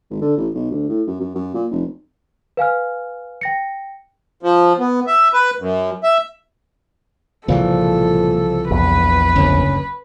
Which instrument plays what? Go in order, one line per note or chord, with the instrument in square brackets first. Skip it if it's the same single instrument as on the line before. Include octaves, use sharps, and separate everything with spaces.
[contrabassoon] G#1
D3
A1
B1
D2
A2
F#2
F#2
F#2
A#2
F1
[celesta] B4 F5 G#5 F6
G5 A#6 C#7
[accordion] F3
B3
E5
B4
F#2
E5
[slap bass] C2 C#3 E3 [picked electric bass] A#2 [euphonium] F3 [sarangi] A4
[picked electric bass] A#1 E2 [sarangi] B4
[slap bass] F#1 D2 [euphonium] C#4